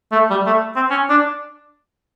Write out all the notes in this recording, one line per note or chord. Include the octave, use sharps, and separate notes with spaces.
A3
G3
A3
C4
C#4
D4